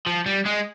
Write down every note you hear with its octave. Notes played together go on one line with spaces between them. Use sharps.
F3
G3
G#3